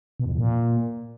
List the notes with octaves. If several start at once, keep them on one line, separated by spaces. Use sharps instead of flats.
B2
F2
E2
A#2